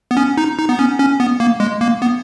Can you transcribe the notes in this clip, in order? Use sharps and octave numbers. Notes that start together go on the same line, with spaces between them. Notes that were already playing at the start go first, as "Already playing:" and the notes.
B3
C#4
D#4
D#4
B3
C#4
C#4
B3
A#3
G#3
A#3
B3